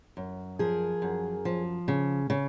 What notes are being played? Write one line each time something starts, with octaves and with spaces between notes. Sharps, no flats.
F#2
F3 G#4 A#4
F#2
F3
C#3
C#3